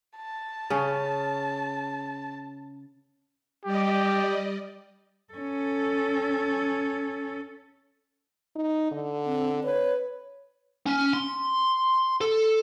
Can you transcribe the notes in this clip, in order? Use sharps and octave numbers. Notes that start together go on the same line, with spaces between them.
A5
C#3 C#4
G3 G4 D5 D#5
C#4 A4
D#4
D3
C4
B4 C#5
C#4
C6
A4